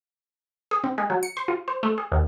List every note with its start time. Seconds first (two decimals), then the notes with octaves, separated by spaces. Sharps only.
0.71 G#4
0.84 C4
0.98 G#3
1.10 F#3
1.23 C#7
1.37 C5
1.48 F4
1.68 C5
1.83 A3
1.98 G#4
2.12 D#2